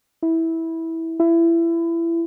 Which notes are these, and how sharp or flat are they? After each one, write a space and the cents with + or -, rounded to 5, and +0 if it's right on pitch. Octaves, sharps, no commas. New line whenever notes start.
E4 -15
E4 +25